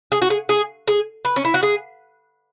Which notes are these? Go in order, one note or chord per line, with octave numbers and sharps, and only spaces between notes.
G#4
F#4
G#4
G#4
G#4
B4
C#4
E4
F#4
G#4